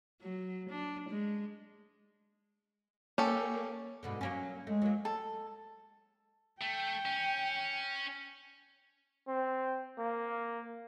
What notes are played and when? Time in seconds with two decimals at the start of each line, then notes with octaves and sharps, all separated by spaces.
0.22 F#3
0.70 D4
1.09 G#3
3.18 A#3 C#4 G4 A4
4.03 G#2 B2 D3
4.21 F#3 A#3 C#4
4.67 G#3 A3
4.82 F#3 A#3
5.05 A4
6.61 A3 G5
7.06 C#4
9.28 C4
9.98 A#3